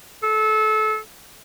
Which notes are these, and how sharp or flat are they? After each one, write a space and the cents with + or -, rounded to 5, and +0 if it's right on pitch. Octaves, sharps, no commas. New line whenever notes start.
A4 -25